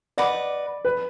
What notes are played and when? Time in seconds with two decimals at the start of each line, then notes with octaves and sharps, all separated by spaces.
0.18 B4 D5 D#5 F#5 D6
0.85 B4